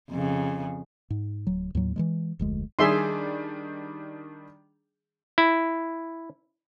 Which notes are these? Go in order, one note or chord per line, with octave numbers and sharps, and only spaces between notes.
F2 C#3
G#2
D1 F#3
D#2 A2 F#3
E3 F#3 G#3
F1 D2 G#3
D#3 G3 D4 G#4 E5 C6
E4